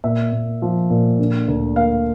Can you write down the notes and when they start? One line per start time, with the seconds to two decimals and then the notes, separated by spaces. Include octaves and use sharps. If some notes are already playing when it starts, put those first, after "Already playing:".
0.04 A#2 E5
0.32 A#2
0.62 F3
0.90 A#2
1.19 D3
1.48 D2
1.76 A#3 F5